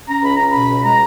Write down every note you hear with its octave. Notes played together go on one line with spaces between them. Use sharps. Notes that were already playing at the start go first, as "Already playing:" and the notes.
C#4 A#5
C#2 B5
C#4 A#5
B2 B5
C#2
G#3 A#5